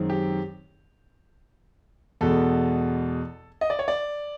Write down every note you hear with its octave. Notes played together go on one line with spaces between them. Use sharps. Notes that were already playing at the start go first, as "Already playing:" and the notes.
Already playing: F#2 D#3 G#3 C4
G4
E2 B2 G#3 A4
D#5
D5
C#5
D5